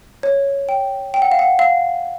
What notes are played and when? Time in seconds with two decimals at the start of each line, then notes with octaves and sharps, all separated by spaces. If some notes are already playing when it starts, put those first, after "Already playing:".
0.23 C#5
0.69 G5
1.14 G5
1.22 F#5
1.32 F5
1.39 F#5
1.59 F5